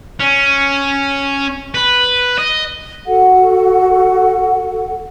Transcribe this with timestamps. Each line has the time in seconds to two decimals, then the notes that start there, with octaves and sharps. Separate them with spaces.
0.20 C#4
1.74 B4
2.38 D#5
3.06 F#4 A4 F#5